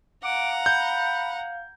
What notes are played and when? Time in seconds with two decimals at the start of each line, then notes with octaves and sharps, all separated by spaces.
0.24 F5 F#5 A#5 D6
0.66 B5 G6